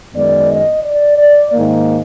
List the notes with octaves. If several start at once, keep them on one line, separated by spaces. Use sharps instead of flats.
F#2 D#3 G#3 B3 D5
D#5
D5
D5
G#2 D#3 A#3